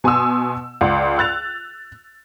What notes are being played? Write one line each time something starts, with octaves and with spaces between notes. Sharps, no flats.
B2 G#5 C6 D#6 E6
C#2 D5 F#5
E6 F#6 A6 F7